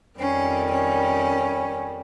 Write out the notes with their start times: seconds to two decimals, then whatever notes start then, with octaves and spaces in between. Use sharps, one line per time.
0.18 F2 D#3 G3 C#4
0.71 C#4